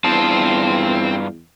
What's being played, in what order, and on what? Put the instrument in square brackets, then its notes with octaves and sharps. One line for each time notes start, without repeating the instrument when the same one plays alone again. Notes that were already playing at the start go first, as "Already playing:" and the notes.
[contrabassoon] E2 [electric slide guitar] G2 F4 A5 [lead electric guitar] C4